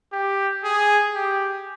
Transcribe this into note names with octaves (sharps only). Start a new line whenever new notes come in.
G4
G#4
G4